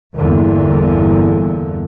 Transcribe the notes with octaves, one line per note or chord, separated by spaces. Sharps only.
G1 E2 A#2 D3